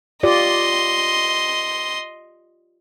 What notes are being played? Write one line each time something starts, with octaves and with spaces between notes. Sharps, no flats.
F4 G4 D5 D#5 C6